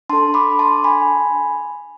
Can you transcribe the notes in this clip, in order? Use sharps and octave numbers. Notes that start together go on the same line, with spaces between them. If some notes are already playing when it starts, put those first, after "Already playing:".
D4 A4 A5 C6
B5 D6
A5 C6
G#5 B5